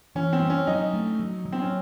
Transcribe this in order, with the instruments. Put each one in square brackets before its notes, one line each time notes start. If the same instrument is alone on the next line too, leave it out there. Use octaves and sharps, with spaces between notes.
[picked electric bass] E3 [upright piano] C#4
[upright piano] C4
[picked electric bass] G3
[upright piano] C#4
[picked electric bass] F#3 [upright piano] D#4
[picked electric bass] A3
F#3
F#3
[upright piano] C4
C#4